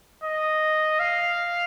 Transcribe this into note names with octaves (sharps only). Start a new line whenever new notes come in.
D#5
F5